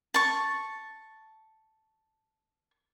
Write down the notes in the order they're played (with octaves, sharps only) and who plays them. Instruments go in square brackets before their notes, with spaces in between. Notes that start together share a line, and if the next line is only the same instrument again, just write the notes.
[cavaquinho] A5 C#6